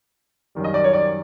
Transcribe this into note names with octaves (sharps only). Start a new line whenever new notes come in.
F#2 D#3 G3
D#5
D5
C#5
D5